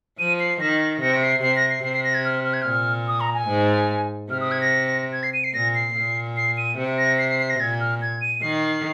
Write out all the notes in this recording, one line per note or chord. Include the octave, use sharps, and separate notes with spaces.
F3 D#7
C7
D#3 A#6
C3 A#6
C7
C3 C7
A#6
C7
C3 C7
C7
A#6
G#6
F6
F6
G#6
A#2 F6
D#6
A#5
G#5
G#2
C3 F6
D#6
G#6
A#6
G#6
C7
D#7
C7
A#2 A#6
C7
A#2
C7
D#7
C3
A#6
C7
C7
C7
A#6
A#2 G#6
F6
G#6
D#7
D#3 C7